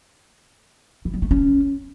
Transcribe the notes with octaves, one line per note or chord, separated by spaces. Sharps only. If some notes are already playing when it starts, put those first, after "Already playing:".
E3
G3
A3
C#4